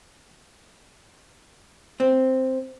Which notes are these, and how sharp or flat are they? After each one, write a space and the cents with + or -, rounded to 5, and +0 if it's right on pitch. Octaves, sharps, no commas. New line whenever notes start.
C4 +0